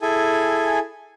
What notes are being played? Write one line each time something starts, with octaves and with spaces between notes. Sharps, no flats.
E4 G#4 A4 G#5